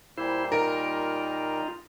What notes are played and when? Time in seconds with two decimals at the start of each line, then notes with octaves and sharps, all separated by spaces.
0.18 A#2 G3 A#3 E4 C5
0.52 D#4 F4 A#4